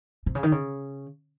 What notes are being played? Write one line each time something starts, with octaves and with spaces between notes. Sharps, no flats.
C3
C#3
D#3
C#3